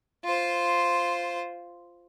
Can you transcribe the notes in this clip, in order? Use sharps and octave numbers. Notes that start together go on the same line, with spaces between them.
F4 C5